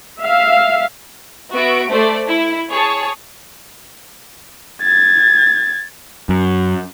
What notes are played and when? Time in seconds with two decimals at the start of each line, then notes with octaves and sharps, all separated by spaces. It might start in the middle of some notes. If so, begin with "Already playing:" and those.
0.20 E5 F5
1.53 B3 F#4 E5 D7
1.89 A3 C5 D5
2.27 E4
2.69 G#4 C#5 A5
4.83 G#6 A6
6.29 F#2